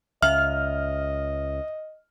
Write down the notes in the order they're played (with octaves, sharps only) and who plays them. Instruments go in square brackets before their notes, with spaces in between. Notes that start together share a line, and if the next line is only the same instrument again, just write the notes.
[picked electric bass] C#2 [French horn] D#5 [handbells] E5 [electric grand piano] F6